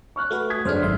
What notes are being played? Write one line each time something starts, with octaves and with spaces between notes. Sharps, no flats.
C#6 F6 F#6
A3 F#4 B4
D#6 G#6 B6
F#2 D4 G#4 C5 F6
G#1 E5 C6